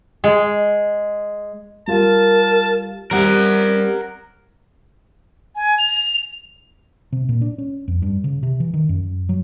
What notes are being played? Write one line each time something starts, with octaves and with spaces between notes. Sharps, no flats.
G#3
G3 F4 A#4 A5
G3 C4 G4 A#4 F#5
G#5
F7
C3
A#2
D4
C#4
F2
G2
C#3
C3
E3
D#3
F#2
F#3